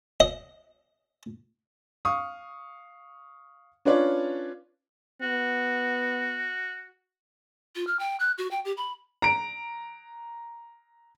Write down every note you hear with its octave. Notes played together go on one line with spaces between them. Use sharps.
D#5
F5 C#6 D#6
C#4 D4 F4 B4 C#5 D5
B3 F#4
F4
F6
G5
F#6
F#4
G5
G4
B5
A#5 D7